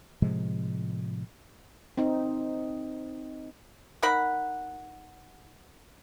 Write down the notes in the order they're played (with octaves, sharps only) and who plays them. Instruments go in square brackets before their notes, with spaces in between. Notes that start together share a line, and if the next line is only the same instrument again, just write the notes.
[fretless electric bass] A2 C3 F3 G#3
[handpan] C4 D#4
[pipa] D#4 A#4 F#5 B5